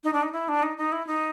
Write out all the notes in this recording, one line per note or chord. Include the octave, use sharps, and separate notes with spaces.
D#4
D4
D#4
E4
D4
D#4
D#4
E4
D#4